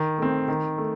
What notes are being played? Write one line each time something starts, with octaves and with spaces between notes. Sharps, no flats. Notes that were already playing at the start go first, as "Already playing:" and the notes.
Already playing: D#3
A3 C4
D#3
A3